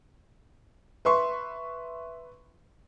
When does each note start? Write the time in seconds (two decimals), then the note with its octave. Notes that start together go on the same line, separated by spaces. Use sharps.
1.05 B4 E5 C6 C#6